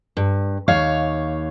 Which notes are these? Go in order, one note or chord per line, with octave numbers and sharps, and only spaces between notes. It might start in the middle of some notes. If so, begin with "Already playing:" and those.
G2
D#2 C#5 F5